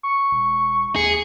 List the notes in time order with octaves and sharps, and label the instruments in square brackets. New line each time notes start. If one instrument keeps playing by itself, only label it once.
[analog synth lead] C#6
[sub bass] E1
[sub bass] D#2 [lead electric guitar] G#4 [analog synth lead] C#7